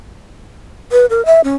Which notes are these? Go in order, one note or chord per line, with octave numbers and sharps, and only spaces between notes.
B4
A#4
E5
C#4